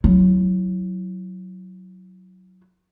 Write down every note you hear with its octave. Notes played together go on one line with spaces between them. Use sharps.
F#3 E4